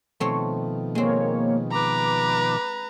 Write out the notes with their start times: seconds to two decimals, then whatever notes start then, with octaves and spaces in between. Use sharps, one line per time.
0.20 B2 D#3 F3 A3 C4 C#5
0.95 G#3 A#3 C4 C#5
1.72 B4 A#5 D6